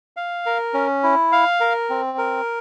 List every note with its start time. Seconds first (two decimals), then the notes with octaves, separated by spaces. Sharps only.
0.17 F5
0.46 A#4
0.74 C#4
1.03 E4
1.32 F5
1.60 A#4
1.90 C4
2.18 A#4